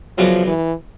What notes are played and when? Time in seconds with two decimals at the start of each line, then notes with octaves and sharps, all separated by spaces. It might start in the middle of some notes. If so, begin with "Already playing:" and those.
0.18 F#2 C#3 F3 F#3 B3 D4
0.47 E3